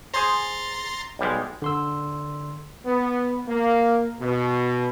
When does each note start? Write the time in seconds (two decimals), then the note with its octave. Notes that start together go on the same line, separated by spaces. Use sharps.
0.14 G#4 C5 A#5 C6 A6
1.19 B1 G3 G#3
1.62 D3 C6 E6
2.86 B3
3.48 A#3
4.20 B2